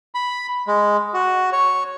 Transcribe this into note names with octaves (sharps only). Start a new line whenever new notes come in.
B5
G#3
F#4
C#5